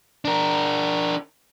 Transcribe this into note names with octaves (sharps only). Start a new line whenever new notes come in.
D4 A#4